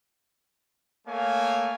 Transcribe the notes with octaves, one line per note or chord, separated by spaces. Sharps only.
A3 A#3 C#5 F5 G#5